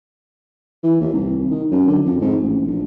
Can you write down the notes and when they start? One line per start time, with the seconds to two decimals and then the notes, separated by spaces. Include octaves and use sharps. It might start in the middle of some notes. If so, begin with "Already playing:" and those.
0.83 E3
1.01 D#2
1.13 C2
1.51 D#3
1.71 F#2
1.87 D3
2.04 F2
2.21 G#2
2.42 A1
2.67 A#1